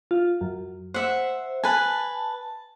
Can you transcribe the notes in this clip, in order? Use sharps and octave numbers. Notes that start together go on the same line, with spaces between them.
F4
F#2
C5 E5 F#5
B4 G#5 A5